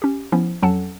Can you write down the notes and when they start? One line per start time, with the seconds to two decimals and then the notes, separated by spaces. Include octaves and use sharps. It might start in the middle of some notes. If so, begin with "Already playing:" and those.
0.02 C#4 G4
0.32 F3 B3 C#4 E4
0.62 F2 F#3 C#4 A4 F#5 A5